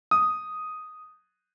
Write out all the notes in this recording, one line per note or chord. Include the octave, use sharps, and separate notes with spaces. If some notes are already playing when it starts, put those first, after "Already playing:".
D#6